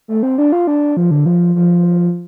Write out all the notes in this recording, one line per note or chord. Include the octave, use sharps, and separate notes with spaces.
A3
C4
D4
F4
D4
F3
D3
F3
F3